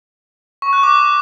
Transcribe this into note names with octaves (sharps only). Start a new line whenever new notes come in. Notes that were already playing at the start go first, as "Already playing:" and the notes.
C#6
F#6
D6